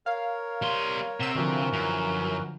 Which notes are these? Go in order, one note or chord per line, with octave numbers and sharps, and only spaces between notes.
A#4 C#5 F5
G3 C6
C3 F#5 A#5 E6
D3 E3 F3 F#4 A#4
F#2